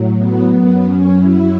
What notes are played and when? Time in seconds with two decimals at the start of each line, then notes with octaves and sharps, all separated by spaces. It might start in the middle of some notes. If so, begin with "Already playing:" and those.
Already playing: A2 F#3
0.17 B3
0.49 F#2 F#3 B3
0.82 C#4
1.16 E4